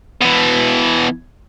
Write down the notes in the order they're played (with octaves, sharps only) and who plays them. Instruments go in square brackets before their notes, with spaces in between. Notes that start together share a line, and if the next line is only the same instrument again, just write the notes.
[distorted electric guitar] B2 E3